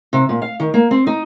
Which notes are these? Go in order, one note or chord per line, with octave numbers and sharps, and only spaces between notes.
C3
A#2
F5
D#3
A#3
C4
D#4